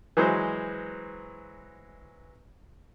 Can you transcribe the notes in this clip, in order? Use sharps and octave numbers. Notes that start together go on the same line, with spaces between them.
E3 F#3 G#3 C5